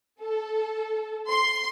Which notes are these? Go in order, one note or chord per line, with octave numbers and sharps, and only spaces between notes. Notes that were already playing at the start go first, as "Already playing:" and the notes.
A4
C6